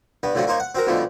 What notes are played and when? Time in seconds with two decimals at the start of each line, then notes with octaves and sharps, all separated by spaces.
0.23 G2 B3
0.35 A2 D3 F3 F#3 F#4
0.47 A#3 D#4 C5 C#5
0.60 F#5
0.75 C4 F#4 A#4
0.87 G#2 B2 D3 F3 G3 A3